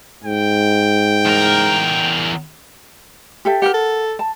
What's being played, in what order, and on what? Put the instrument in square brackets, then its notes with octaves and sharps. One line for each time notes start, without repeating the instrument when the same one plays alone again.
[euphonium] G#2 [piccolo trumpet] G5
[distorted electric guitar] E2 A#4
[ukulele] G4 A4 E5
[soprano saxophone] G4 [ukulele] A#4 F#5
[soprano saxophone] A4
[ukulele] A5